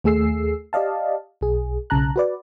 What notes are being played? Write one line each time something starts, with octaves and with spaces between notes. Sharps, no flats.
D#2 A3 G#4 E6 C7
G4 D5 D#5 F5 A5
B1 G#4
B1 C#3 A5 A#5 F#6
F#4 B4 D5